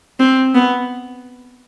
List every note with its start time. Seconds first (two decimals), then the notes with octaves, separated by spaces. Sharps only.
0.19 C4
0.55 B3